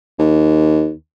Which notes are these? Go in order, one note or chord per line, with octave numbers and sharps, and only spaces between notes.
D#2